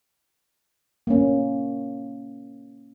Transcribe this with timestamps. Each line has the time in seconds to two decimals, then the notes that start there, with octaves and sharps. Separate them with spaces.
1.07 A#3 C#4